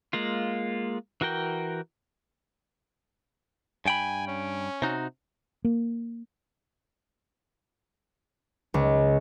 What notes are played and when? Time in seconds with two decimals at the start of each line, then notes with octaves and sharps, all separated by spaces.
0.13 G#3 A#3 F4
1.21 E3 F#4 A#4 G5
3.86 G2 G5 G#5 B5
4.28 C#4
4.82 C3 D#4 F#4
5.64 A#3
8.74 C#2